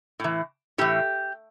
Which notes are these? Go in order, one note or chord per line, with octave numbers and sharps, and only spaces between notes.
A2 E3
A2 E3 G4